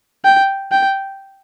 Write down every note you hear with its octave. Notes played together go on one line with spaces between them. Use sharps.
G5
G5